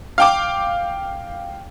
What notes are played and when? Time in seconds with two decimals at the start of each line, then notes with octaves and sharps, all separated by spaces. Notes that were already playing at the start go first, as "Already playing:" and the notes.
0.18 F5 G5 D6